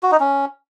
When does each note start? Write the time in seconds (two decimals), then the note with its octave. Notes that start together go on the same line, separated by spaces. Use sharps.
0.03 F#4
0.12 D#4
0.20 C#4